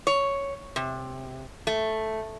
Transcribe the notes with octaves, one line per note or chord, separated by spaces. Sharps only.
C#5
C3
A3